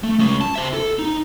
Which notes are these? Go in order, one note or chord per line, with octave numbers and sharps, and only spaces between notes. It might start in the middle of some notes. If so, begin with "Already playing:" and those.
A3
G#3 C#4
A5
C5 E5
A4
D#4